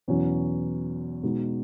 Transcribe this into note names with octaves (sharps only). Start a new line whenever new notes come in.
E2 B2 F#3 C#4
B2 G#3 D#4 F#4